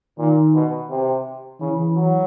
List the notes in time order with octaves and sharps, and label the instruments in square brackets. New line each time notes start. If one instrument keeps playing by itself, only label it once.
[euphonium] A#2 [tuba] D#3
[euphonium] B2
C3
[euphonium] C#3 [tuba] E3
[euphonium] F#3